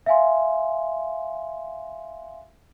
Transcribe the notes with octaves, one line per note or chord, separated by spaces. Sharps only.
E5 F5 G#5 C6